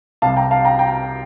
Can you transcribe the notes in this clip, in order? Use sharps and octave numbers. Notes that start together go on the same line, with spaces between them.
C2 C3 G3 F5 A5
G5 A#5
F5 A5
G5 A#5
G5 A#5